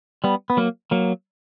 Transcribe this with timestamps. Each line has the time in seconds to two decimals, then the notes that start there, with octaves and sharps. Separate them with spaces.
0.24 G3 B3
0.50 B3
0.57 F#3 A#3
0.91 F#3 A#3